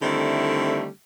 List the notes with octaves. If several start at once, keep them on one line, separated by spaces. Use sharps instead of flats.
D3 D#3 G3 A3 C4 E4